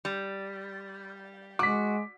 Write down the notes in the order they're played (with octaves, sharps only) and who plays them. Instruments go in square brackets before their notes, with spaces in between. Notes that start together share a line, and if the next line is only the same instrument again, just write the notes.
[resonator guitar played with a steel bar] G3
[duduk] G#3 [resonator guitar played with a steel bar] F#4 [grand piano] D6 B6